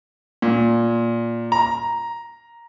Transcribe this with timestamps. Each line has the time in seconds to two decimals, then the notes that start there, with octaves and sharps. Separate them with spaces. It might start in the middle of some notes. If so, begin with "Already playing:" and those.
0.42 A#2
1.52 A#5